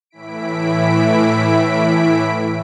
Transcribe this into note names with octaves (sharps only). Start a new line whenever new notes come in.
A2 E3 E4 B6 D7